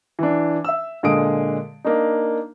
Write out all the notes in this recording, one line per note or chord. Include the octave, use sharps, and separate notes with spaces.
E3 D4
E5 E6
A#2 D3 G#3 D#6 D7
A#3 D4 D#4